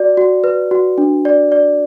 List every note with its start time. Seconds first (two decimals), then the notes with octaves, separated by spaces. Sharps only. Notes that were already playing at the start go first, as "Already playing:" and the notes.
Already playing: F#4 D5
0.17 F#4
0.44 B4
0.71 F#4
0.98 D4
1.25 D5
1.52 D5